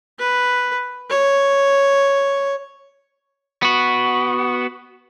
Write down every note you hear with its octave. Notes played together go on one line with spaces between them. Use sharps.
B4
C#5
B3 F#4